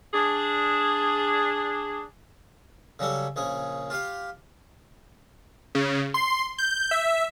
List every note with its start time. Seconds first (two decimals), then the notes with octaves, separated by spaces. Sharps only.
0.14 D4 G#4
2.99 C#3 F#3 G3 A4
3.36 A#1 C#3 G#4
3.90 F4 G4 F5
5.75 C#3
6.14 C6
6.58 G6
6.91 E5